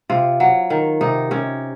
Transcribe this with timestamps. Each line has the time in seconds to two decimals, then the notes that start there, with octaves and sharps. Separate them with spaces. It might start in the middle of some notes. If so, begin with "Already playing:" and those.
0.10 C3 F4
0.40 F#3
0.70 D#3
1.01 C3 D#4
1.31 C3 C#4